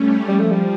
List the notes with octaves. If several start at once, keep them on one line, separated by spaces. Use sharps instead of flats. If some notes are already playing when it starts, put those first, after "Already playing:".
Already playing: G3 A3 C#4
F3 G3
A3
G3